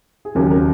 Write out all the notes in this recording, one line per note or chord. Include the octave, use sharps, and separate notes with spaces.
G#4
D#2 C#3 F#3 C#4 A#4
A#4